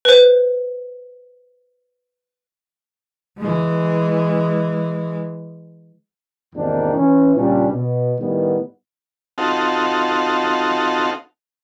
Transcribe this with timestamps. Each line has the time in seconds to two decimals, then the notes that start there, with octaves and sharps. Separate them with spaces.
0.05 B4 C5
3.38 E3 G#3
6.55 E2 G#2 C3 D#3 A#3 D4
6.96 E3 C#4
7.36 C#2 A#2 G3 C#4 D4
7.71 B2
8.18 A2 D#3 G3 B3
9.38 C4 D#4 F4 F#4 A4